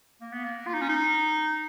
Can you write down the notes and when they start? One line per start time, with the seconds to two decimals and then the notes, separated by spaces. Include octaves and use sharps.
0.21 A#3
0.33 B3
0.44 A#3
0.66 F4
0.74 D#4
0.81 C#4
0.89 D#4